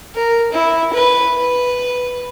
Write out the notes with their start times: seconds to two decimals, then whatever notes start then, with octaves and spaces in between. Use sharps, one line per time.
0.15 A#4
0.52 E4
0.93 B4
1.38 B4